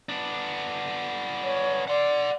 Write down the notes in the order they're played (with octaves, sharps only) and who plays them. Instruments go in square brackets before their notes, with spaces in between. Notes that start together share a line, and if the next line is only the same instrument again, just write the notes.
[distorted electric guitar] B3 D4
[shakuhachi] C#5
[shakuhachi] D5 [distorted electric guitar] F#5 C6